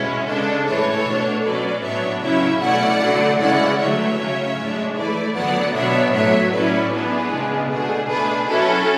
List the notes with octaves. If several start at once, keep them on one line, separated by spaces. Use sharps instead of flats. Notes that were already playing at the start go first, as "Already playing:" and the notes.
Already playing: B2 G#3 C#4 E4
C#3 G#3 D4 A4
A2 E3 A3 A4 C#5
B2 A3 D4
B2 F#3 C#4 B4 D5
A2 F#3 B3 D4 C#5 E5
C#3 F#3 C#4 E4 C#5 E5
B2 A3 C#4 E4 D5 F#5
D3 F#3 A3
C#3 E3 G#3 C#4 E4 D5 F#5
D3 F#3 A3 C#5 E5
C#3 F#3 C#4
A2 G#3 D4
E3 A3 E4 B4 D5
D3 F#3 B3 D5 F#5
B2 F#3 B3 D4 C#5 E5
A2 F#3 A3 C#5 E5
A2 F#3 C#4 E4 B4 D5
E3 B3 D4 G#4 B4
C#3 G#3 B3 D4
B2 A3 D4 G#4
B2 A3 D4 G#4 B4
F#3 C#4 E4 A4